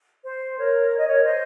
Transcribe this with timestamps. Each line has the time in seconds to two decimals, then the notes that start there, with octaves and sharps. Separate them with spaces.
0.24 C5
0.57 A#4 C#5
0.91 C#5
0.99 D#5
1.08 A#4 C#5
1.24 C5 D#5